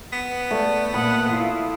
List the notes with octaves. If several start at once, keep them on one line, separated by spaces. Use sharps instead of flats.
B3
A3 D5
A#2 F#5 B5 D#6
E4 F4